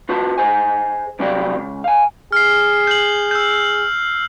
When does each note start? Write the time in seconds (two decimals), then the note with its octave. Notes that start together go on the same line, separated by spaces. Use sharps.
0.09 F4 F#4 B4 E5 A5
0.38 G#4 C5 D#5 G#5
1.19 G2 C3 F#3 G4 D5 F5
1.56 C#2
1.84 F5 G#5
2.32 G#4 F6 C7
2.87 G6 F#7
3.31 E6 G6